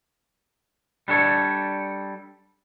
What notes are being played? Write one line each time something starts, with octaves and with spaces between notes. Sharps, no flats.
G3 D4 A4 C#5